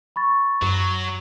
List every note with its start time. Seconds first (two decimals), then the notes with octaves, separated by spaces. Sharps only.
0.16 B5 C#6 A6
0.62 F#2 F#3